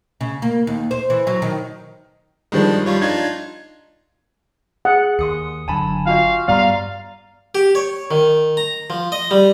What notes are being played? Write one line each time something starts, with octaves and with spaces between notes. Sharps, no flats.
C#3
A#3
D#2
C5
E3
F#3
D#3
G2 D#3 F3 G#3 D4
G3 F4 C#5
D4 D#4 F4 G#6
G#4 F#5
D#2 C6 D#6 C#7
F#1 D3 F#3 G#5 A5 B5
F4 F#4 D#5 F5
G2 G3 B3 D5 F5 A#5 C6
G4
C#5
D#3
A#5
F3
D#5
G3